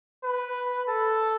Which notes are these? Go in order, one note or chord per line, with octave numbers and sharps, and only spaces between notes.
B4
A4